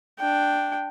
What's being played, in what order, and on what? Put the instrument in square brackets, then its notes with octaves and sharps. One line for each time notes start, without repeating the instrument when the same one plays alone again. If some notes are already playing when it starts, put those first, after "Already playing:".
[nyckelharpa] D4 G5